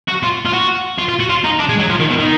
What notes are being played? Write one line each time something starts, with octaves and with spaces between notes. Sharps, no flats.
F#4
F4
F4
F#4
F4
F4
F#4
F4
D#4
D4
G#3
F#3
F3
D#3
B2
D#3